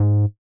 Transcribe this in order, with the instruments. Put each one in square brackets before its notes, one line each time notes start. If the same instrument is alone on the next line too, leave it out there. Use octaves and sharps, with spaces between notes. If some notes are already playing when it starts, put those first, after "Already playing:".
Already playing: [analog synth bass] G#2